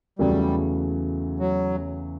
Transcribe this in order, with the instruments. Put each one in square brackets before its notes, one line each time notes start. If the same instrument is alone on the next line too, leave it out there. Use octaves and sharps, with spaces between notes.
[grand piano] E2 C#3 F#3 A3 [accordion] G3
[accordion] F#3